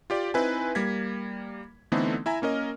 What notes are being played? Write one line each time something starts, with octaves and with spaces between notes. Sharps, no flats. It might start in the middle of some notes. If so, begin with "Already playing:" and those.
F4 G4 D5
C4 D#4 E4 B4 E5 G#5
G3 A#3 G#6 B6
D3 E3 A3 B3 C4 D#4
E4 E5 G#5 A#5
A#3 C#4 A#4 D#5